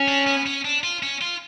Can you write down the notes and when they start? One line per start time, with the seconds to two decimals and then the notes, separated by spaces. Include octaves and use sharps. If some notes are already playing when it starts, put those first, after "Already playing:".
Already playing: C#4
0.08 D4
0.27 B3
0.47 C#4
0.65 D4
0.84 F4
1.03 C#4
1.22 F4